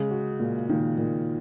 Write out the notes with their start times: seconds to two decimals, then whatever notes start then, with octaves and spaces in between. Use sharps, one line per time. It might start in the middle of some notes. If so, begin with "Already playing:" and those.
Already playing: C#3 G#3
0.11 F#4
0.40 A#2
0.69 A#2 D#3
0.98 A#2